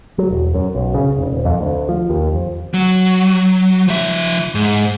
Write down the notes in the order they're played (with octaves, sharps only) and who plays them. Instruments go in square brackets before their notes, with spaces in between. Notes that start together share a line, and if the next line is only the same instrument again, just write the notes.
[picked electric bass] F#3
E1
F#2
B1
C#3
F1
D#1
F2
D2
F3
D#2
F2
[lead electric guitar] F#3
F3 E5
G#2